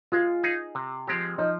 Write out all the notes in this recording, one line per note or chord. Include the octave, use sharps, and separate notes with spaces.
G#3 F4
D#4 G#4
C3
F3 G#3 C4 G4
F3 D#4